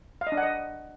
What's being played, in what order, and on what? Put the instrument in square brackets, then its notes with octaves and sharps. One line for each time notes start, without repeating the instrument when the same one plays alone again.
[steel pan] F5
D#5
D4
F#5
D#5